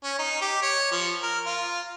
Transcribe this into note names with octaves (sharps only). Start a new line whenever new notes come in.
C#4
D#4
G4
C#5
F3
A#4
F4